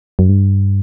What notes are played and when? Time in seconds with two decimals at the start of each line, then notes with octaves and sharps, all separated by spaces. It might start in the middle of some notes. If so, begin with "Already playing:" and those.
0.19 F#2
0.29 G2